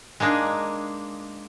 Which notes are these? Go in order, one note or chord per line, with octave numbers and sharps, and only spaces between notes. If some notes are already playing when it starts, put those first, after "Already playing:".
G#3 A#3 D4 D#4 G#4